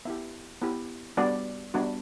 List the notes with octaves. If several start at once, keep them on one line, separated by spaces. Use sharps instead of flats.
B3 E4 G4 E5
B3 E4 G4
G3 B3 D4 F#4 D5
G3 B3 D4 F#4